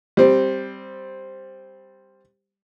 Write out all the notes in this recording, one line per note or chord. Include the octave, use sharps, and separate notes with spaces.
G3 C4